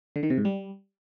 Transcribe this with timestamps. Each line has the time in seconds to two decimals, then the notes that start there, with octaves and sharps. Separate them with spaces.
0.16 D3
0.23 D#3
0.30 C3
0.38 G#2
0.45 G3